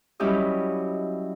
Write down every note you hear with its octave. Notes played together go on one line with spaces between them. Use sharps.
F#3 G3 C#4 E4 G4 D#5